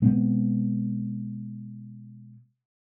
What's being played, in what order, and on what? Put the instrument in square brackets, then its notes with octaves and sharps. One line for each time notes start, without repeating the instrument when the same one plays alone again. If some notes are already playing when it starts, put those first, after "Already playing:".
[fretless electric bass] B2 G#3 B3 C4